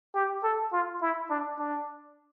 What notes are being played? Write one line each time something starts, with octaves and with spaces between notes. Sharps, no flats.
G4
A4
F4
E4
D4
D4